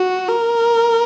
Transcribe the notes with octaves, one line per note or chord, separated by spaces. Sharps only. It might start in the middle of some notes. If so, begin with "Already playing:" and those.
Already playing: F#4
A#4